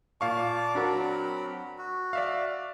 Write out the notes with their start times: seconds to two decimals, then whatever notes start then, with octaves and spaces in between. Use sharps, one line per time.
0.21 A#2 D5 F5 A5 C#6
0.75 F#3 C4 D4 F#4 A#4 B5
1.78 F#4
2.13 D5 E5 F5